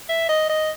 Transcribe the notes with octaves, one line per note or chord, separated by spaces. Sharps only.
E5
D#5
D#5